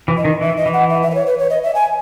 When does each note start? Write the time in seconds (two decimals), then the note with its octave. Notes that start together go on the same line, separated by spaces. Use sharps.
0.08 E3
0.17 D#5
0.25 D#3
0.41 E3 E5
0.57 D#5
0.66 E3
0.73 F#5
0.89 E5
1.03 E5
1.11 B4
1.15 C#5
1.26 B4
1.39 C#5
1.50 D#5
1.63 E5
1.75 G#5